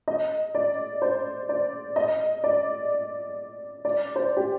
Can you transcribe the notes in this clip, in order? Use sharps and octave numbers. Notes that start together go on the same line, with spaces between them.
D#5
D5
C5
D5
D#5
D5
D5
C5
G4